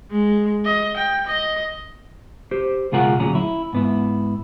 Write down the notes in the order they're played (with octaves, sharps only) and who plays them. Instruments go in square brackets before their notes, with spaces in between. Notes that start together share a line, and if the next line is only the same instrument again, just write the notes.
[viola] G#3
D#5
G5
D#5
[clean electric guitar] G4 C5
C#2 B2 F4 G#4 A#4 F#5
D2 A#2 F#3 C#4 G#4 A#5
E4
G#2 B3 E4